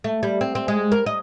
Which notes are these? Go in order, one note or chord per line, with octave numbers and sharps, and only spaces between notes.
A3
G3
C4
C4
G#3
A#4
D#5